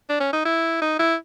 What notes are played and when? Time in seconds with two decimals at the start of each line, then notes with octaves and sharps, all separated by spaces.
0.09 D4
0.20 C#4
0.33 D#4
0.45 E4
0.82 D#4
0.99 E4